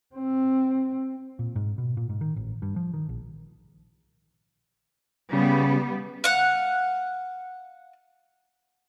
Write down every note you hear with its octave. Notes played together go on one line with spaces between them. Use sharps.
C4
A#2
G#2
B2
A#2
G#2
D#3
A1
G2
F3
D#3
A#1
C#3 G3 B3
F5 F#5